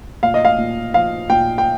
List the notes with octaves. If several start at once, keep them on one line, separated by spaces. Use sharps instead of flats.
A#2 F5
D#5
F5
A#2
F3 F5
A#2 G5
G5